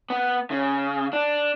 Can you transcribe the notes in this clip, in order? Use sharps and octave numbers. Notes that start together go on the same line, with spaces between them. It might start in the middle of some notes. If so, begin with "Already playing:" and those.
B3
C#3
D4